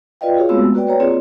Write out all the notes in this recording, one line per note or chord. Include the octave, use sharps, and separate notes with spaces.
F4 B4 D5 D#5 F5 G5
F4 F#4 G#4 C#5 F5
G#3 A3 B3 C4 F#4 E6
A#3 F#4 B4 D5 G5
B4 C#5 A#5
A#3 C4 F4 G#4 C#5 D5